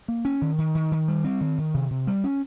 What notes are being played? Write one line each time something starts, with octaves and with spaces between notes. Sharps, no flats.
A#3
C#4
D#3
D#3
D#3
D#3
G3
C4
D#3
D#3
C3
C3
G3
C#4